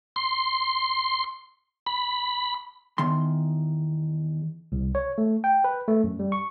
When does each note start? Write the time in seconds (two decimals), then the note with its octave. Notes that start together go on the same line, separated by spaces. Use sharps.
0.16 C6
1.86 B5
2.98 E2 D#3 C6
4.72 C2
4.95 C#5
5.18 A3
5.44 G5
5.64 B4
5.88 A3
6.04 F#2
6.19 G3
6.32 C#6